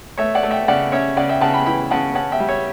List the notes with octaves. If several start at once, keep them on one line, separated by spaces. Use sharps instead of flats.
A3 C#5 E5
D5 F#5
A3
E5 G5
C#3 D5 F#5
C#4 C#5 E5
C#3 D5 F#5
E5 G5
C#3 F#5 A5
G5 B5
E3 G5 B5
C#3 F#5 A5
C#4 F#5 A5
E5 G5
G3
C#5 E5